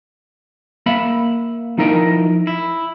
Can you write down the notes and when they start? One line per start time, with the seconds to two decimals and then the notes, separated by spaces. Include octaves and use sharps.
0.86 A#3 E5 B5
1.78 F3 D#4 E4 A#4
2.47 E4